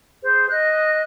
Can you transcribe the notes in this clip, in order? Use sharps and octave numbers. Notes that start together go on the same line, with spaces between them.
G#4 C5
D#5 F#6